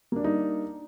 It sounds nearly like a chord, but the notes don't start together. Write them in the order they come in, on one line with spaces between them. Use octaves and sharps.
A#3 D4 G3 D#4